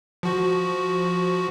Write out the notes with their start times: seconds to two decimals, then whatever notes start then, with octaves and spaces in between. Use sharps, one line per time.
0.23 F3 F#4